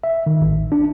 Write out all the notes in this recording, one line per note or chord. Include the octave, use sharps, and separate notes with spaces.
E5
D#3
A1
D4